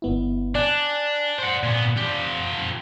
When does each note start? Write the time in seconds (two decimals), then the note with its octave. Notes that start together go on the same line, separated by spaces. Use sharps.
0.02 G1 B3 E4
0.55 D4 D5 G#5 F#6
1.39 C5 F#5
1.63 A#2 B3
1.97 F3 G4